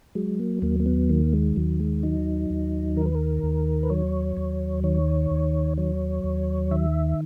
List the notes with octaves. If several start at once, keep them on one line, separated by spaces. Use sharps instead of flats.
F#3 G#3
A#3
D#2 A#3
A#3
B3
D#3 A#3
G#3
D#2 F#3
G#3
F#3 D#4
D#2
D#3 A#4
B4
A#4
D#2
B4
F#3 C#5
D#2
D#3 C#5
D#2
F#3 C#5
D#2
D#3 E5